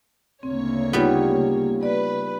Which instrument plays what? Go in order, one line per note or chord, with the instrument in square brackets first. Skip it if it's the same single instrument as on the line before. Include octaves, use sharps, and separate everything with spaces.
[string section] D2 C#5 [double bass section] C#3 A#3 [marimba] C4
[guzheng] G3 B3 [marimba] D#4 F4
[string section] B4 [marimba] D5